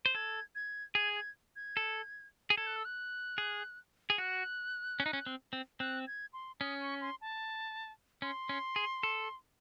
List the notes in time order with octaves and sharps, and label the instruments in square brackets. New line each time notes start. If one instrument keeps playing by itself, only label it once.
[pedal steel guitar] C5
[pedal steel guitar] A4 [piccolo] G#6
[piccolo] G#6
[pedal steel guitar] G#4 [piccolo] G#6
[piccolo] G#6
G#6
[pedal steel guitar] A4
G#4
[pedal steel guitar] A4 [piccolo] G#6
[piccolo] F#6
E6
F#6
[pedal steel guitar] G#4
G#4
[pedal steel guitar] F#4 [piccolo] F#6
[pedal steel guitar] C#4
D#4
C#4
C4
C4
[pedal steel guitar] C4 [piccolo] F#6
[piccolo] G#6
C6
[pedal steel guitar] C#4 [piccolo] D#6
[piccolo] C#6
C6
A5
[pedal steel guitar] C#4 [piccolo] C6
[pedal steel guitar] C#4
G#4
A4